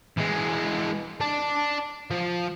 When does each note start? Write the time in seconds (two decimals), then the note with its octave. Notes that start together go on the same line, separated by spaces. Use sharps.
0.18 E3 G#3
1.21 D5 A5
2.11 F3